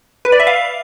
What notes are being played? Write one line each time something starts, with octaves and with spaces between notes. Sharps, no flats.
B4
D5
E5
F5